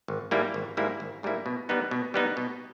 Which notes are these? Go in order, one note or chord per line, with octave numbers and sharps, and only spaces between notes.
G#1
G#2 G3 A#3 E4
G#1
G#2 G3 A#3 E4
G#1
G#2 G3 A#3 E4
B2
G3 B3 D#4
B2
G3 B3 D#4
B2